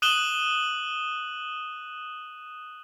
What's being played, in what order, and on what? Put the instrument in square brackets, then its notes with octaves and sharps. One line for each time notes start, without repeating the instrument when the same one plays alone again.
[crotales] D#6 F#6 D#7 E7 F#7 G7